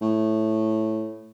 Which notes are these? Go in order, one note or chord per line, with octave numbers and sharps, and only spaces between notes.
A2